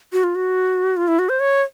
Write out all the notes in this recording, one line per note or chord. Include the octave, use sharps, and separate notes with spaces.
F#4
F4
F#4
F4
E4
F#4
C5
C#5